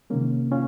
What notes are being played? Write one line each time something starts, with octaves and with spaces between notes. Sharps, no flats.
C3 D#3 G#3 A#3 C#4
C#4 F4